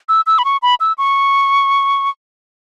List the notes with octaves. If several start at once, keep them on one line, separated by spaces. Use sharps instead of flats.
E6
E6
B5
C#6
B5
E6
C#6